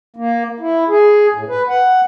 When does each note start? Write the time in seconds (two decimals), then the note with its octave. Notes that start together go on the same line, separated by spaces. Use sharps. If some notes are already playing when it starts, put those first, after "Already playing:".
0.16 A#3
0.60 E4
0.89 G#4
1.34 A2
1.49 B4
1.69 F#5